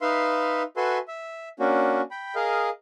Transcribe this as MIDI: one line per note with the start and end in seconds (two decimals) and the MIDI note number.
0.01 0.62 63
0.01 0.62 71
0.01 0.62 76
0.01 0.62 77
0.01 0.62 84
0.77 0.98 66
0.77 0.98 69
0.77 0.98 71
0.77 0.98 76
0.77 0.98 80
0.77 0.98 84
1.08 1.49 76
1.60 2.01 58
1.60 2.01 61
1.60 2.01 62
1.60 2.01 66
2.11 2.35 79
2.11 2.35 83
2.35 2.69 68
2.35 2.69 70
2.35 2.69 75
2.35 2.69 77